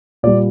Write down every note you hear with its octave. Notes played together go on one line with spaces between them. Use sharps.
A#2 G3 D5